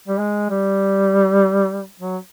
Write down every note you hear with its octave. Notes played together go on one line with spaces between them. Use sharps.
G3
G#3
G3
F#3